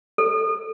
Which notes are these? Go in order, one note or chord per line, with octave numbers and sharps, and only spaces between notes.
A4